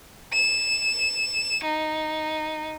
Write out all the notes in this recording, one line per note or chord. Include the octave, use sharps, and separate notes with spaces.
E7
D#4